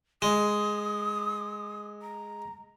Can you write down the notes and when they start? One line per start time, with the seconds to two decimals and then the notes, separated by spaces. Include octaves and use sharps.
0.22 G#3 D#6
2.02 A#5